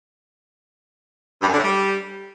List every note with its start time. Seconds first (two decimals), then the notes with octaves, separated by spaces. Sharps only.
1.42 G2
1.47 F#2
1.53 D3
1.58 A2
1.63 G3